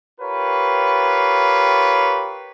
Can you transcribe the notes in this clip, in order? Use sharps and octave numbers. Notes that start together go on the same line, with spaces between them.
F4 G4 A#4 B4 C#5